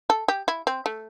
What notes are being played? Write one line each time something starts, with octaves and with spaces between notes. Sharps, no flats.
A4
G4
E4
C4
A3